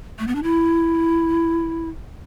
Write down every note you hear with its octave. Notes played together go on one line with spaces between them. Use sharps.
A3
B3
D4
E4